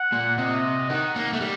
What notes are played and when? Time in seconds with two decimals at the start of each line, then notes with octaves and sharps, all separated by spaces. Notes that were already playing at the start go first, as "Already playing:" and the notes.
Already playing: F#5
0.13 A#2
0.38 C3 D#5
0.90 D#3 F#5
1.16 A#3
1.33 A3
1.41 G3